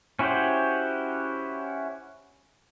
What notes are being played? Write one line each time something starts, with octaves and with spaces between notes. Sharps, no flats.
C#4 E4 F#4 G4 C5